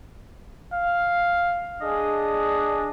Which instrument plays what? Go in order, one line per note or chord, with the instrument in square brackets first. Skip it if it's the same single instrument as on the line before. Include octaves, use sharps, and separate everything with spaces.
[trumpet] F5
[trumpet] D4 [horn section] G#4 D#5